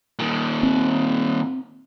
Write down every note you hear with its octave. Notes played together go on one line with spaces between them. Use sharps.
A#2 D#3
C4